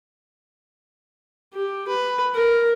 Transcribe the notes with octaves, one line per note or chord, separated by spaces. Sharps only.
G4
B4
A#4